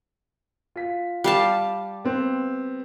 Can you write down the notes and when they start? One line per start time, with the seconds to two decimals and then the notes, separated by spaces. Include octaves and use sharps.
0.76 F4 B6
1.24 G3 F5 A5
2.05 B3 C4